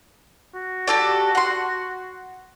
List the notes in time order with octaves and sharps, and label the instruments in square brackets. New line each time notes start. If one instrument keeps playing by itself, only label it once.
[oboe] F#4
[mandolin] G4 A4 D5
F#5 C6